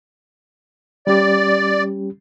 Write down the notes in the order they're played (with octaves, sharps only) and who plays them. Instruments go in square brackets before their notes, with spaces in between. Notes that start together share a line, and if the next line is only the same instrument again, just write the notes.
[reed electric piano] G3 C#4 G4 [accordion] D5